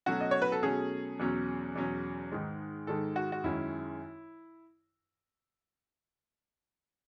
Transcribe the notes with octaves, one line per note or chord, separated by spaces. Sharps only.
B2 F#3 A3 C#4 F#4
D#5
C#5
B4
A4
B2 F#3 A3 C#4 G#4
E2 B2 F#3 C#4
E2 B2 F#3 C#4
G#2 D#3 G#3
G#2 D#3 G#3 A4
F#4
F#4
F#2 D#3 G#3 C#4 E4